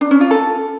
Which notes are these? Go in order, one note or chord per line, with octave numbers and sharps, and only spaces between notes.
D4
C#4
F4
A4